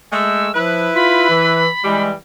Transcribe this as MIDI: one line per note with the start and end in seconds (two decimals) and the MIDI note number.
0.12 0.48 56
0.12 0.48 57
0.12 0.55 88
0.55 0.89 53
0.55 1.62 64
0.55 1.62 71
0.55 0.84 90
0.95 1.26 65
0.95 2.03 83
1.30 1.68 52
1.84 2.13 52
1.84 2.13 55
1.84 2.10 56